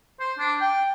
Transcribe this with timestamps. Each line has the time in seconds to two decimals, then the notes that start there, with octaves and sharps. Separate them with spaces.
0.20 C5
0.38 D4
0.61 G5